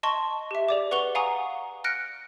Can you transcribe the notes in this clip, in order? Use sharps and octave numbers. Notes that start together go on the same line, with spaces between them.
D#5 A5 C6 C#6
G4 E5
G#4 D5 D6
B4 F#5 C#6 F7 G7
F5 F#5 G#5 A#5 C#6 D#6
F6 F#6 A#6 C#7 D7